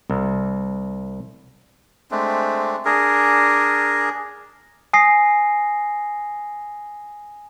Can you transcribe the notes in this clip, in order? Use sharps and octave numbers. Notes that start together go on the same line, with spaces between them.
C2
G#3 A3 C4 D4
D4 G#4 A#4
G#5 D#6 A#6 C7